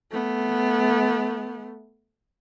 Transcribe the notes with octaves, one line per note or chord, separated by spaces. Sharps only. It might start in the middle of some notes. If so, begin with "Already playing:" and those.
A3 B3